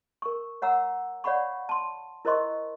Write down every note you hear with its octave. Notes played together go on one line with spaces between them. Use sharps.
A#4 C#6
C#5 F#5 A#5 E6
C#5 D5 F5 F#5 B5 C#6
A5 C6
E4 A#4 C5 D#5 C6 C#6